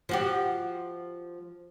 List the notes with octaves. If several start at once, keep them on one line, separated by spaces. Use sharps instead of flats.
F3 F#4 G4